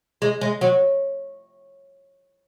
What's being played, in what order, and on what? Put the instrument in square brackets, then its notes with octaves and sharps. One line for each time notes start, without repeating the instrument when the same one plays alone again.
[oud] G#3
G#3
F#3